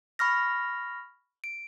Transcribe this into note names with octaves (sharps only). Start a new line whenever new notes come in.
B5 C#6 F6 A#6
D7